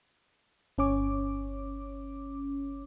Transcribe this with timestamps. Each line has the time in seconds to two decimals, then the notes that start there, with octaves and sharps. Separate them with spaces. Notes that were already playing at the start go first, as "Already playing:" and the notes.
0.78 G1 C#4 C#5 D6